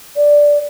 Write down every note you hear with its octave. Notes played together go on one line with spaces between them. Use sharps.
D5